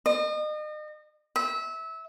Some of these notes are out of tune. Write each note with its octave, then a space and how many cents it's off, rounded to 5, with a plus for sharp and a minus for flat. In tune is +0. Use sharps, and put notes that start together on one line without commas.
D#5 -35
E5 -25